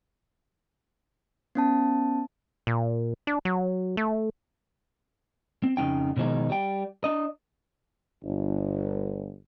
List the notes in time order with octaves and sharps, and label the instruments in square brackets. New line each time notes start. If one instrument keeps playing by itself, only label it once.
[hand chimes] B3 C#4 A5
[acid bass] A#2
D4
F#3
A3
[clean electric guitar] C4
F2 C#3 C#4 D#4 G5
B2 D#3 F3 G#3 D#4
G3 G5
D4 D#5
[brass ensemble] G1